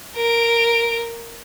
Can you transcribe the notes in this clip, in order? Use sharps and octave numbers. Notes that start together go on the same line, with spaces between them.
A#4 D7